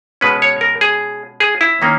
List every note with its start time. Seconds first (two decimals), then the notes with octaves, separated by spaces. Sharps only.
0.21 B2 G#3 C#4 B4
0.42 C#5
0.61 A#4
0.81 G#4
1.40 G#4
1.61 E4
1.82 D#3 A#3 C#4